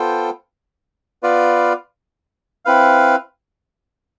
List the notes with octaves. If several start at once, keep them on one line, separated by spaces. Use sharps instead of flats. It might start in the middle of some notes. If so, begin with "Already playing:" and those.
Already playing: B3 F4 A4 C5 G5
B3 F4 B4 D5 F5
C4 E4 B4 F5